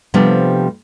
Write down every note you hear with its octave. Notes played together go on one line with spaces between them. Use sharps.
C3 F3 G3 A3 B3 D4